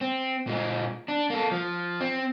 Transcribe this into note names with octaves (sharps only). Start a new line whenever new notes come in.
C4
A#2 G#3
D4
A#3 A4
F3
C4